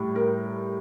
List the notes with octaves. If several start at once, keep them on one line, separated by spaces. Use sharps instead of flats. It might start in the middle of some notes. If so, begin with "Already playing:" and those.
Already playing: A2 G3
A#4